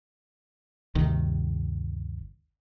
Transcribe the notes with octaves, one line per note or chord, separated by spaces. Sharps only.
G1 D2 C3 D#3